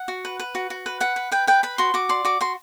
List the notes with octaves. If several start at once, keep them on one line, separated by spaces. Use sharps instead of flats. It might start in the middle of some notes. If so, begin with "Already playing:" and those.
Already playing: F#5
F#4
B4
B4
F#4
F#4
B4
B4 F#5
B4
B4 G5
B4 G5
B4 B5
F#4 C6
F#4 D6
D5 C6
F#4 D6
F#4 C6